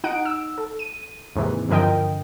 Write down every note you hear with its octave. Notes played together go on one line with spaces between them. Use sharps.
D#4 F#5 D7
E6
A4
D#7
D#2 G#2 C3 E3
G2 D3 F3 A#4 D#5 G5